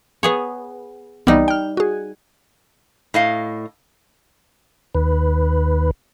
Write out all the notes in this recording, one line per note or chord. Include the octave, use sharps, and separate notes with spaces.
B3 G#4 C#5
C2 E3 G3 B3 D#4
G5 F6
F#4 G#4
A2 D#5 F5
D#2 B4